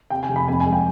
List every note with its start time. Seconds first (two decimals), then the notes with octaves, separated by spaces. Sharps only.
0.10 C3 G5
0.23 G#5
0.29 F1
0.36 B5
0.48 F2 G#5
0.60 G#5
0.66 G#3
0.73 G5